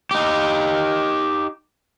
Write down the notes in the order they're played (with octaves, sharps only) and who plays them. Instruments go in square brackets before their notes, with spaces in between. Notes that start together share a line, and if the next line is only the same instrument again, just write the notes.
[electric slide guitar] D#4 G4